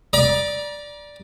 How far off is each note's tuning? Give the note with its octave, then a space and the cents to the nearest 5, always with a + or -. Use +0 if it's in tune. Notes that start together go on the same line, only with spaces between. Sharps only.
D5 +0 A#5 +40